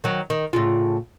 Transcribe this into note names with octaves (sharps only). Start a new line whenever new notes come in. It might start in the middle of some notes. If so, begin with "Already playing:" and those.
D#3 F#3
D#3
A2 C#3 F4